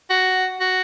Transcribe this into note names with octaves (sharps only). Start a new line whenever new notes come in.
F#4
F#4